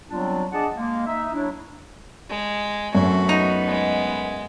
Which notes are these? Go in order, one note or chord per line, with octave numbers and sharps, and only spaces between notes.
F#3 G3 B3 C4 D4 F4
D4 G#4 D5 D#5 F#5 A5
G#3 A#3
D#4 E5
F#3 D4 E4
G#3
F#2 A3 C4 F#4
B3 D#4
G#3